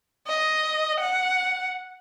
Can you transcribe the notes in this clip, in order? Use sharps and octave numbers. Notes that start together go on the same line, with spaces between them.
D#5
F#5